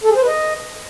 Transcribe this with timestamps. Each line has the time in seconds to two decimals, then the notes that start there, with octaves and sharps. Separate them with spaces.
0.04 A4
0.10 G#4
0.16 C5
0.22 B4
0.27 D#5